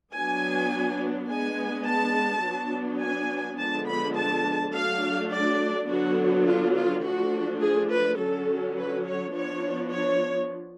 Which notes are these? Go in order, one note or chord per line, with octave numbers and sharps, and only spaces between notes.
F#3 B3 D4 G#5
G#3 B3 D4 G#5
A5
F#3 B3 D4
G#5
D3 F3 G#3 B3 D4 A5
B5
A5
F#3 A3 D4 F5
D5
D3 F#3 B3 D4 F#4
F4
F4
F3 A3 D4 F#4
G#4
B4
D3 F#3 C#4 A4
B4
C#5
F3 B3 D4 C#5
C#5